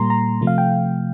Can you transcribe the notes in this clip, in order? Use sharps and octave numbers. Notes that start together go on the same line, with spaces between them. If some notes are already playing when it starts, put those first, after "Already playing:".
Already playing: A#2 G3 A#3 A#5 C6
A#5
C3 F3 A3
F5
G5